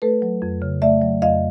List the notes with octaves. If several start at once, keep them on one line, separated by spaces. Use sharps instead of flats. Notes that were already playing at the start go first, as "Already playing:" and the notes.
A3 A4 B4
F#3
F2
C#3
A3 D5 E5
F#3
F2 D#5 F5